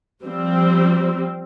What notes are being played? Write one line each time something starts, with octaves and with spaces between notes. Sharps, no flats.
F3 G3 C4